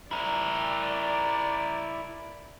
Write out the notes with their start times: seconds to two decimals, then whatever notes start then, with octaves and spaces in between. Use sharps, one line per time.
0.11 E4 A#4 D5